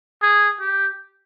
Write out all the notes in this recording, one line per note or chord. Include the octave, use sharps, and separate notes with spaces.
G#4
G4